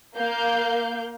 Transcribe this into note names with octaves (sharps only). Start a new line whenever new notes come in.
A#3 F5 G6